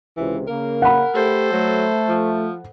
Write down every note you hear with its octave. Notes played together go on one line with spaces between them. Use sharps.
C#2 C3 E3
C#3 A#3 A#4
F#5 B5
A3 G4 A4 C5
F#3 A3
F3